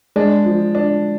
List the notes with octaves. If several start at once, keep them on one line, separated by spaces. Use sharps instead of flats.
G#3 D4
F3
D4